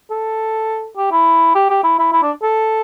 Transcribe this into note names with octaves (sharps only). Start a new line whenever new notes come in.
A4
G4
E4
G4
G4
E4
E4
E4
D4
A4